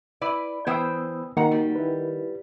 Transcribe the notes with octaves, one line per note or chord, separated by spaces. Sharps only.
E4 B4 D5
E3 B3 C5 G5 D#6 E6
D#3 A#3 F#4 F#5 A#5
G3
E4 B4